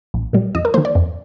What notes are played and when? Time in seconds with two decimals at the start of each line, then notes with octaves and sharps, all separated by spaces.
0.14 A#1
0.33 A#2 G3
0.55 F2 D#5
0.65 A#4
0.74 D#3 A#3 C5
0.85 D5
0.95 F2